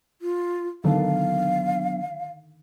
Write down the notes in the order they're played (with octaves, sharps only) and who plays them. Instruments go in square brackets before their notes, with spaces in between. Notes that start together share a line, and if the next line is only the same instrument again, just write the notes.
[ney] F4
[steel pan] D3 D#3 A4 [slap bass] F#3 B3 D4 [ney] F5